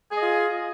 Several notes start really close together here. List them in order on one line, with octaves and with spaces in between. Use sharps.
G#4 D#5 F4